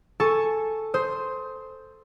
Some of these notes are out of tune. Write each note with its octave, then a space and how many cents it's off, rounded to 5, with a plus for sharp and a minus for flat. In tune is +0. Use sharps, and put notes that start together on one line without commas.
A4 +0 G#5 +0 C#6 +0
C5 +0 D#6 +30